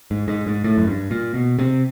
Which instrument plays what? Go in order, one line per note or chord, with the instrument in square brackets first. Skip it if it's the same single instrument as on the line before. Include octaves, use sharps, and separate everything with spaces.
[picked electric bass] G#2
G#2
G#2
A2
F#2
G2
A#2
B2
C3